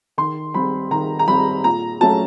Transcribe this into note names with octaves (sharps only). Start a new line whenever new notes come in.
D#3 C6
G3 C4 B5
D#3 A#5
A#5
G3 C4 B5
A#2 A#5
F#3 A3 C#4 A5